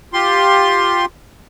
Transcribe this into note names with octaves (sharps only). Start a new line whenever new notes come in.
F4 G4 C6